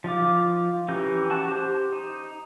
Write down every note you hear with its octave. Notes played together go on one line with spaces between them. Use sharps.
F3 D#4 F4 D6
E3 C#4 G4 A#5 G6
F#4 A5
G4 C5
D#4